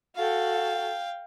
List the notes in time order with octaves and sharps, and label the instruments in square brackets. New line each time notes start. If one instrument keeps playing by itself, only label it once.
[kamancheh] F#4 A4 [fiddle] F5 G5